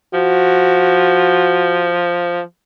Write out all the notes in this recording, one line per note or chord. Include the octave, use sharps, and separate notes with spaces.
F3 F#4